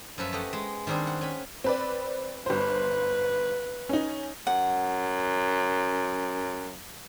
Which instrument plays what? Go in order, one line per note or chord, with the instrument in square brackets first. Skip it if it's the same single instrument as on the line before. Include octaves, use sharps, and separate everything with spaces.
[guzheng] F#2 F3 B4 E5
A3 G4 D#5 F#5
G#3
D#3 G3 C4 D4 G#4
F#5
C#4 G#5 B5
[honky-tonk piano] C4 B4 D5
[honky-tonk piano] G1 C5 [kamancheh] B4
[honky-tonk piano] C#4 D#4
[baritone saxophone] F#2 [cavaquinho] F#5